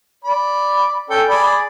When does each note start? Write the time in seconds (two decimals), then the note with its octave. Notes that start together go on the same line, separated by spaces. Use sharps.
0.24 D5 B5
1.10 C#4 A4 G5
1.29 G#4 D5 B5